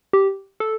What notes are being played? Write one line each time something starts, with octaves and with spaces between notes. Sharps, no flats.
G4
A4